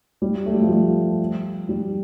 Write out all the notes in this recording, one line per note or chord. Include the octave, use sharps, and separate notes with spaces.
G3
A3
G3
F3
G3
G3